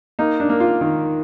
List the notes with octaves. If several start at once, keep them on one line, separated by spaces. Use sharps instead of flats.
A#3 D#4
D4
A#3
F4
D#3